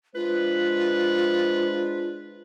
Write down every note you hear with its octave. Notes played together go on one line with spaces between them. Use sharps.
G#3 D4 F4 B4 C5